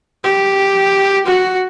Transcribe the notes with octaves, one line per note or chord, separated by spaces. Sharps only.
G4
F#4